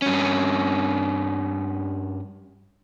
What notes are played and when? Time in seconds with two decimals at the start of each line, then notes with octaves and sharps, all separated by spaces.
0.02 G2 C#4